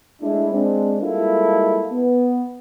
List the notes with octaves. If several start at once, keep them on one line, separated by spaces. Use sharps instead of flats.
G#3 A3 D4 E4
G#3 C4 D4
G3 G#3 A#3 E4 F4 A4
B3